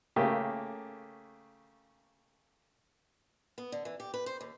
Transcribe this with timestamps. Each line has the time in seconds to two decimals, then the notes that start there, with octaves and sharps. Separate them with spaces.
0.16 C#3 A3 A#3 G4
3.58 B3
3.72 D3
3.85 E3
4.00 G4
4.14 B4
4.26 C5
4.41 D#2